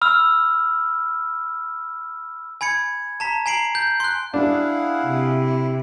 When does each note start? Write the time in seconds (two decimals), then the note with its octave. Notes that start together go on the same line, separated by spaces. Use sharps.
0.01 B5 E6 F6
2.61 G#5 B5 G#6 C#7
3.20 A5 A#5 B6
3.46 G#5 A#5 C7 D7 F#7
3.75 G6
4.00 C6 F#6
4.34 D4 E4 G#4 F5 F#5
5.03 C3